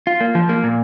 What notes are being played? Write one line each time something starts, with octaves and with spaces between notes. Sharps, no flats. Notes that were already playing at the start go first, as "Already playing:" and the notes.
F4
A#3
F3
A#3
A#2